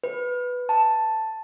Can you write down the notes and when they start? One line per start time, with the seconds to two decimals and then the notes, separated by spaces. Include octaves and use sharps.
0.04 B4
0.69 A5